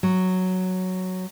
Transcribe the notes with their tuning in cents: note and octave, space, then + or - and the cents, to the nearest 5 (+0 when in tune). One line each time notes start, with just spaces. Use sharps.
F#3 +0